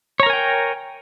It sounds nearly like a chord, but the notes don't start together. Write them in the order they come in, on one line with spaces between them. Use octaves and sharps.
C#5 A#5 A#4 G#5 G5